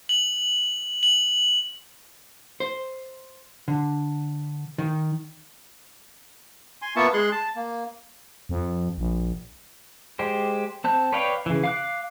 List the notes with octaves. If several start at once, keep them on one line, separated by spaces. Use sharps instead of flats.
F#7
F#7
C5
D3
D#3
G#5 C6
A#3 B3 F4 E5 A5 C#6
G#3 G#4 C6 F#6
A5
A#3
F2
A#1
G#3 G4 C5
C4 A5 G6
B4 C#5 D5 F5 G5
C#3 E3
F5 D6 F#6